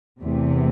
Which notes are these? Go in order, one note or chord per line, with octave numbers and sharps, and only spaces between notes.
E2 C3 E3 A3